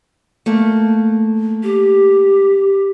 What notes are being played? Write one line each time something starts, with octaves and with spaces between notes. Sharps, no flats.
A3 A#3
G4